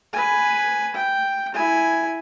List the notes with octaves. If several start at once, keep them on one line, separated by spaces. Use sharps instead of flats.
B4 G#5
G5
E4 G#5